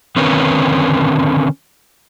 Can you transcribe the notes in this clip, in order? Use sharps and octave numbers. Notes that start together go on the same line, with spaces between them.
D3 D#3 C4 C#4 A#4 B4